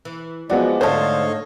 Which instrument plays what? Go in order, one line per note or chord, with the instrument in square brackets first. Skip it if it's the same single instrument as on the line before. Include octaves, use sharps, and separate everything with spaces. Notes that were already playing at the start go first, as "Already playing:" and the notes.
[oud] E3
[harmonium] F3 G#3 [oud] F#3 [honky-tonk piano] B3 F#4 D5
[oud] G#2 A3 [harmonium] D3 F5 [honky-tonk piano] C5 A5 [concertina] C#5 D#5